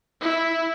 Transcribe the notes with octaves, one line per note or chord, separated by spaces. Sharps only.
E4